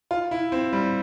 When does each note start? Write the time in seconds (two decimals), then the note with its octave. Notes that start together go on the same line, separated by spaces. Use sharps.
0.11 F4
0.31 E4
0.52 C4
0.73 G3